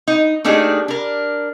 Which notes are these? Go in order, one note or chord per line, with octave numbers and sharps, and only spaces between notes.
D#4
A3 A#3 D4 D#4 G4 G#4
D4 A#4